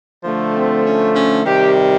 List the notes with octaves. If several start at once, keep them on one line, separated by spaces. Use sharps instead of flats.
D3 F3 A3
C4
C#4
C#4
C3 D#3 G3 G4